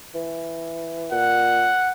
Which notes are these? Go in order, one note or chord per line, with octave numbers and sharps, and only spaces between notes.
E3
A#2 F#5